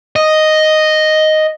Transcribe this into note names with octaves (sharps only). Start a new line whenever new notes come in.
D#5